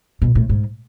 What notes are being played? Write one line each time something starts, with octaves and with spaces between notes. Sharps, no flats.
B2
A2
G#2